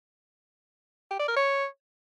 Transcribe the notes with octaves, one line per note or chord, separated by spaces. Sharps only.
G4
D5
A#4
C#5